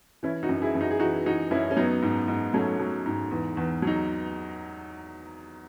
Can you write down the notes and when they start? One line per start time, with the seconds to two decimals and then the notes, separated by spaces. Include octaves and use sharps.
0.23 E3 C#4 E4
0.43 D#4 F#4
0.49 F#2
0.62 E4 G#4
0.75 F#2
0.81 D#4 F#4
0.91 G#4
1.00 E3 D#4 F#4
1.26 E3 D#4 F#4
1.51 F#2 C#4 E4
1.71 C#4
1.77 F#3 B3 D#4
2.02 G#2
2.28 G#2
2.54 F#3 A3 C#4
2.80 F#3
3.06 G#2
3.31 E2
3.57 E2
3.82 F#3
3.87 D#4